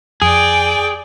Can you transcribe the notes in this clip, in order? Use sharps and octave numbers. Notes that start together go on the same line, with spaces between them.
F2 G#4 D5 G5